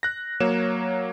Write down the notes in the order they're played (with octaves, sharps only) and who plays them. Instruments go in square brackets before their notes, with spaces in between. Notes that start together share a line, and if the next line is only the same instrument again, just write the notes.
[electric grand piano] F#6 A#6
F#3 A#3 C#5 E7